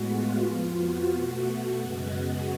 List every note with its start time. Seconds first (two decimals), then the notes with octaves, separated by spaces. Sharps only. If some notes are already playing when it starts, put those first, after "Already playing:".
Already playing: A2 G#3 B3 F#4
0.12 F4
0.46 F2 F3 B3
0.78 F#4
1.12 B2 A3
1.45 F#4
1.79 F#2 C#3 G#3 B3